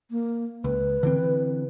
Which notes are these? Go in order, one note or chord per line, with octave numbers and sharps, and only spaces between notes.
A#3
C#2 B4
D3 E3 C4